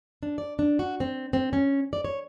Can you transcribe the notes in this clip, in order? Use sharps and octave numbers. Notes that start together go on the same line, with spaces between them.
D4
D5
D4
F#4
C4
C4
C#4
D5
C#5